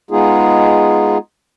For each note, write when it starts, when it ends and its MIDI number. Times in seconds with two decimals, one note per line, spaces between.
0.11 1.18 56
0.11 1.18 59
0.11 1.18 63
0.11 1.18 65
0.11 1.18 68